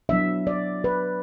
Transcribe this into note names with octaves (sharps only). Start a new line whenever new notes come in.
F#3 B3 D4 E5
D5
B4